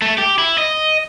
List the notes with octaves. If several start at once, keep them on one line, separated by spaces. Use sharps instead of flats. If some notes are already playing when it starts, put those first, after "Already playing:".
A3
G4
E4
D#5